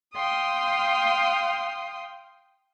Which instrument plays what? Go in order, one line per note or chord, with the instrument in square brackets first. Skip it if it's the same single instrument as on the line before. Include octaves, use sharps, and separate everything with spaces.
[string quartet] F5 G5 C6 D#6